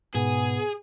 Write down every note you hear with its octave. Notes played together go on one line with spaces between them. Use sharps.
G#2 B2 B3 G#4